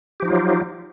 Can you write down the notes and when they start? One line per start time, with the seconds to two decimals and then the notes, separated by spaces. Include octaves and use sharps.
0.20 G4
0.22 F3
0.25 D#4
0.28 F4
0.30 F#3